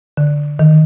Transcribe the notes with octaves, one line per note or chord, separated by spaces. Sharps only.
D3
D#3